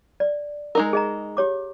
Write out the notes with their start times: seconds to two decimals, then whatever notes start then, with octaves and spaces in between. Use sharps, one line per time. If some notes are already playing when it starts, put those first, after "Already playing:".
0.20 D5
0.75 G#3 D#4 A#4 E6
0.93 G#4 D#5 A#5
1.37 G4 C#5 D6